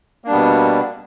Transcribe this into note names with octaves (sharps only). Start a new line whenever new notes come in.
B2 G3 A#3 B3 D4